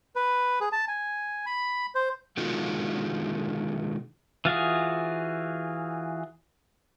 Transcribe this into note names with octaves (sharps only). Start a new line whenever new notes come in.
B4
G#4
A5
G#5
B5
C5
B2 D3 D#3 G#3 F4 F#4
E3 F4 F#4 G#4